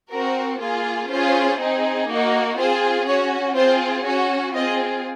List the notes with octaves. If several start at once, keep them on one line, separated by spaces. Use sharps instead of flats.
C4 F#4 A#4
A#3 F4 G#4
C#4 F4 G#4 C5
C4 D#4 G#4
A#3 D#4 F#4
C4 F4 G#4 C5
C#4 F#4 C#5
C4 F4 G#4 C5
C#4 F#4 C#5
C4 F4 G#4 D#5